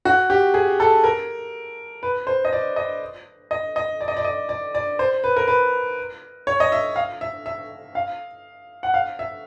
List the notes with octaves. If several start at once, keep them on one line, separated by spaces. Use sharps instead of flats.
F#4
G4
G#4
A4
A#4
B4
C5
D#5
D5
D#5
D#5
D#5
D5
D#5
D5
D#5
D5
D5
C5
B4
A#4
B4
C#5
D#5
E5
F5
E5
E5
F5
F#5
F5
E5